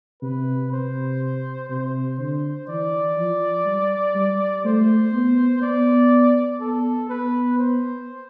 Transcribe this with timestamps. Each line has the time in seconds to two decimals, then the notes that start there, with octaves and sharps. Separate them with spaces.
0.22 C3 B4
0.72 C3 C5
1.70 C3 C5
2.19 D3 C5
2.68 E3 D5
3.18 F3
3.66 G3
4.15 G3
4.65 A3 C5
5.13 B3
5.62 B3 D5
6.61 B3 A4
7.09 B3 B4
7.59 C5